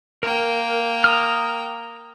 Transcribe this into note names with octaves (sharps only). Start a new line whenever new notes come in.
A#3 A#4 G5
A#5 D#6 F6